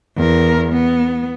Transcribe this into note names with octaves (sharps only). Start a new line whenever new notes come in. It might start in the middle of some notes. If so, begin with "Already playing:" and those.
E2 A#4
B3